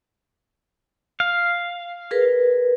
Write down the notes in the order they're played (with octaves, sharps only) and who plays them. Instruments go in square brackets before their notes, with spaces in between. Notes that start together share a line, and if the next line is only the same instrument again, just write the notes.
[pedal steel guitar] F5
[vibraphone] G#4 A#4 B4